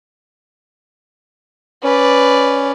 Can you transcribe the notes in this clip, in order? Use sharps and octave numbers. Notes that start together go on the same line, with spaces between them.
C#4 B4 D5